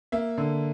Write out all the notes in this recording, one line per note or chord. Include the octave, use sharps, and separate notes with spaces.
A#3 E5
D3